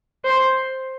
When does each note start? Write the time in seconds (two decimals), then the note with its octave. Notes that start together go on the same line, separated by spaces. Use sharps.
0.25 C5